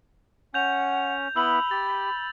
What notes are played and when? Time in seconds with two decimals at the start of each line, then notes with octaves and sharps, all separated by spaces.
0.54 C#4 F#5 G6 F7
1.36 B3 E4 B5 E6 F#7
1.71 G4 A6